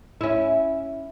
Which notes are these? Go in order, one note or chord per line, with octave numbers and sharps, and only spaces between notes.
C#4 E4